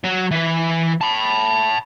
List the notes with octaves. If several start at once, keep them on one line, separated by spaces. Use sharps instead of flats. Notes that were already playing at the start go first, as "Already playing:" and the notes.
F#3 F#4
E3 B4
A5 B5